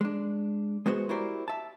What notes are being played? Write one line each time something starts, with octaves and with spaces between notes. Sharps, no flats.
G#3 D4
G#3 B3 F#4 C5
E4 F#4 G4 A#4 C5 D5
E5 A5